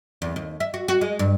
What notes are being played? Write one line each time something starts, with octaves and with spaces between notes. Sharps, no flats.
E2
D#2
E5
F#4
F#4
G#3
G2